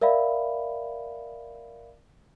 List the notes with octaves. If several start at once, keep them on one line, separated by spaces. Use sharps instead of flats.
A#4 D5 E5 F5 B5